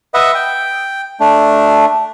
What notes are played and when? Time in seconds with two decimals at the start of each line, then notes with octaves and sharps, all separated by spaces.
0.14 B4 D#5 E5 F#5
0.35 G5
1.20 A3 D4